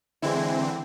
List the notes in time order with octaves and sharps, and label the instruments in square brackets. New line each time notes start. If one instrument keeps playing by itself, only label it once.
[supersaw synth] D3 E3 C4 [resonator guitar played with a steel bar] G#3 E4